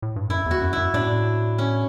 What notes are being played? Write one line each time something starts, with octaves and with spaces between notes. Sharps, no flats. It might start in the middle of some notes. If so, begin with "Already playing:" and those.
A2
G2
F#2 E4
E2 F#4
F#2
F#2 E4
A2 D4
C#4